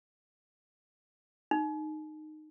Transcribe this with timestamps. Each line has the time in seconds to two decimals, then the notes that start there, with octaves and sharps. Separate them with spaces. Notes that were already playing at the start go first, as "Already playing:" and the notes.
1.51 D#4